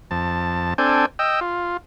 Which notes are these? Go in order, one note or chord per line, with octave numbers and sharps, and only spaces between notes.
F2 A5
C4 D4 A4 G5 G#5
D#5 G5 E6
F4